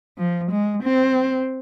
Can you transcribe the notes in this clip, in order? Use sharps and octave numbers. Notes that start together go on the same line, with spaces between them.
F3
G#3
C4